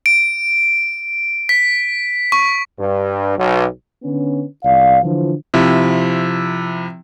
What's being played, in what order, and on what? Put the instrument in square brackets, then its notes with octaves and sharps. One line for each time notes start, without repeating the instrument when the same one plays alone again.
[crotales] D7
B6
C#6
[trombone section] G2
B1
[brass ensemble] D3 B3 C#4
C2 D5 F5
D3 E3 F3
[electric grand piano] C3 F3 E4